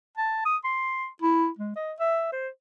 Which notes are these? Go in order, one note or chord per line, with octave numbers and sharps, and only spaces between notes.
A5
D#6
C6
E4
G#3
D#5
E5
C5